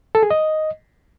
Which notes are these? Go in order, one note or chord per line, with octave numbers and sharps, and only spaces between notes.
A4
G#4
D#5